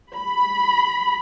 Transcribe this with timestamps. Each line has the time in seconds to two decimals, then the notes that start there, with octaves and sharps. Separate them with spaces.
0.16 B5